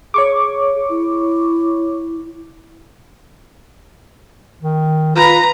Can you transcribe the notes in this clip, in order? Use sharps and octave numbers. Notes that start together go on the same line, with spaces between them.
G#4 C#5 C#6 D6
E4
D#3
F4 B4 A#5